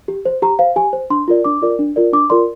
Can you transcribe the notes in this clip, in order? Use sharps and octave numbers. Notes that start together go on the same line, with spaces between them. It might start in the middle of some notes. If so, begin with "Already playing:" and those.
G4
C5
G4 A#5
C5 F5
G4 G#5
C5
D4 C6
F4 A#4 D5
D4 D6
F4 A#4 D5
D4
F4 A#4 D5
D4 D6
F4 A#4 D5 C6